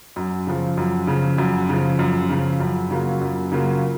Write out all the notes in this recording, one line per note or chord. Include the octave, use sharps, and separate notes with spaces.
F#2
C#3 F3
F#2
C#3 F3
F#2
C#3 F3
F#2
C#3 F3
F#2
C#3 F#3 A#3 F4
F#2
C#3 F#3 A#3 F4